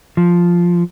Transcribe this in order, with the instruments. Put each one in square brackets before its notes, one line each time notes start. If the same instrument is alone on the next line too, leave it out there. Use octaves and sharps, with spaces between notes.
[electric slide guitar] F3